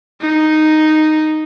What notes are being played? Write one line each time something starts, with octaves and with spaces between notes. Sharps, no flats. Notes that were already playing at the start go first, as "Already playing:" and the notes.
D#4